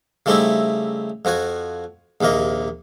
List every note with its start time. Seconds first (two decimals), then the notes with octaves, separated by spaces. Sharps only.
0.26 C#3 G3 A3 C4 D#4 E4
1.25 F2 F3 F#4 G#5
2.21 A#1 D#2 C3 A#3 D#5